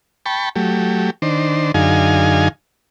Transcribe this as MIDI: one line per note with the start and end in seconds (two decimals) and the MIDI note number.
0.26 0.49 79
0.26 0.49 81
0.26 0.49 83
0.26 0.49 85
0.56 1.10 54
0.56 1.10 57
0.56 1.10 67
1.22 1.72 51
1.22 1.72 62
1.22 1.72 72
1.74 2.48 42
1.74 2.48 50
1.74 2.48 63
1.74 2.48 68
1.74 2.48 77
1.74 2.48 80